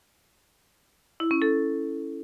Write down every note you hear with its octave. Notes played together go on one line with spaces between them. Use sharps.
E4
C#4
A4